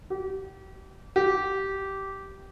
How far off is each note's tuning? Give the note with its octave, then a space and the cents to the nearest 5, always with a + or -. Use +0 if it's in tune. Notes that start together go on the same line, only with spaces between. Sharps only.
G4 -30
G4 -15